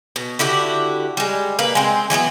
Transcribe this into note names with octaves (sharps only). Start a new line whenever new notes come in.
B2
D3 E4 F#4 G4
G3 G#3
A#3 B4
G#3 C4
E3 F#3 A3 B3